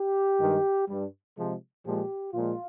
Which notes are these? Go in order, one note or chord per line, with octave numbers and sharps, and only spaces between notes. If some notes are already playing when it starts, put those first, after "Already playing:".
Already playing: G4
G2 D#3 G#3
G2 G3
C3 F3 G#3
A#2 F3 G#3 G4
A#2 F3 G#3 F4